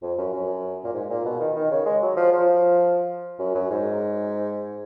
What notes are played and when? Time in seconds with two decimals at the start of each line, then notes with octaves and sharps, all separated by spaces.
0.02 F2
0.18 F#2
0.33 F#2
0.84 A#2
0.93 G#2
1.10 A#2
1.25 B2
1.40 D#3
1.56 D#3
1.71 C#3
1.86 G#3
2.02 F#3
2.17 F3
2.32 F3
3.39 F#2
3.55 F#2
3.70 G#2